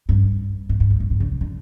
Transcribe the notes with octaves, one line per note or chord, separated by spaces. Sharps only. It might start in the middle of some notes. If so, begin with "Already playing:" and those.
G2
A2
G2
F2
G2
A2
D3
C3
D3